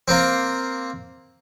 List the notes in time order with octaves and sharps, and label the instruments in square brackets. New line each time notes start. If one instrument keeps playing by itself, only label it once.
[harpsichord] A#3 C4